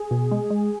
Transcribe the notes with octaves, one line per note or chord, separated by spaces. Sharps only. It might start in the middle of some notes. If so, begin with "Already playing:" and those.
Already playing: G#4
B2
G#3
G#3